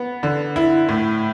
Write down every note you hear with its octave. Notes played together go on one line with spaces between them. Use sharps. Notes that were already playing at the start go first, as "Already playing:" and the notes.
Already playing: B3
D3
E4
A2